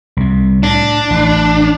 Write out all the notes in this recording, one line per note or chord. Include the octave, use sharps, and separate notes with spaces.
C2 C3
A2 D4
A1